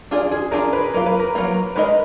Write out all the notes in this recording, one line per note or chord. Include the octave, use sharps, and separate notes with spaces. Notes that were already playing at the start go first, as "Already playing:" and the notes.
D4 F4 G#4 D5
G#4
D4 F4 G#4 A#4 D5
B4
F#3 A#3 F4 A#4
B4
A#4
F#3 A#3 F4
G#3 D#4 A#4 B4 D#5